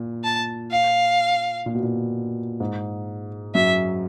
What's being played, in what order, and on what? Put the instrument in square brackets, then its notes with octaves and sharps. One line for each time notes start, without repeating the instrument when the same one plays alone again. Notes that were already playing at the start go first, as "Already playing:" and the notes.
Already playing: [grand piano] A#2
[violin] A5
F5
[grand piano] A#2
B2
A#2
G#2
[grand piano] F#2 [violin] E5